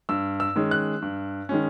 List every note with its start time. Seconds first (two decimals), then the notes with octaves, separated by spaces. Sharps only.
0.09 G2 E6
0.40 E6
0.56 D#3 G#3 C#4
0.71 F#6
1.02 G2
1.49 D#3 G#3 C#4